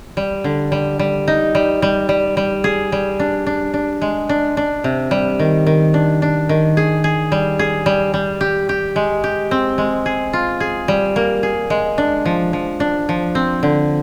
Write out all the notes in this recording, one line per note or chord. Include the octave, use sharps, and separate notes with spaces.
G3
D3
G3
G3
D#4
G3
G3
G3
G3
G#4
G3
D4
D4
D4
G#3
D4
D4
C3
G3
D#3
D#3
D4
D4
D#3
G#4
G#4
G3
G#4
G3
G3
G4
G4
G#3
G4
C4
G#3
G#4
F4
G#4
G3
A#3
G#4
G#3
D4
F3
F3
D4
F3
C4
D3